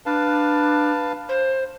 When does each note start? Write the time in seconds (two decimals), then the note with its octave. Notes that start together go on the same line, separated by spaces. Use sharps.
0.06 D4 B4 F5 A5
1.29 C5